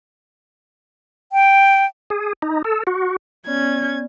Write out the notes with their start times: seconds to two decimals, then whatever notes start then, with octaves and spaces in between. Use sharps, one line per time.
1.32 G5
2.10 G#4
2.42 D#4
2.64 A4
2.87 F#4
3.47 B3 C#4 D5 G#6